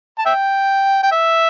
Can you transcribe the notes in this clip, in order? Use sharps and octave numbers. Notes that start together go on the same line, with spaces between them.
A5
E5 G5
G5
E5